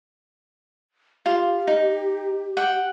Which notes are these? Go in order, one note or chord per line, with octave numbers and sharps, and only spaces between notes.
F4 G4
D#4
F#5 G5